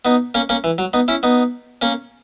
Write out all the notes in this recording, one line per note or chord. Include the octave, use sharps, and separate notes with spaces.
B3 D#4
A#3 C#4
A#3 C#4
E3
F#3
B3 D#4
C#4 E4
B3 D#4
A#3 C#4